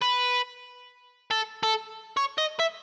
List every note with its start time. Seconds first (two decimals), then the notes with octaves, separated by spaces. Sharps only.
0.01 B4
1.31 A4
1.63 A4
2.17 C#5
2.38 D#5
2.60 E5